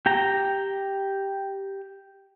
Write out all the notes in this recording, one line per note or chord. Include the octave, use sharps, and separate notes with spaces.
G4 G5 A#5